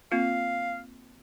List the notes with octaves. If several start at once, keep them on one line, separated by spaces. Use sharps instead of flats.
A#3 C4 F4 F5